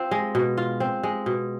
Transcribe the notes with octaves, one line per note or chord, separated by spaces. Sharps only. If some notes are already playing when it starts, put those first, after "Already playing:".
Already playing: C4 F4
G#3
B2
F4
C4
G#3
B2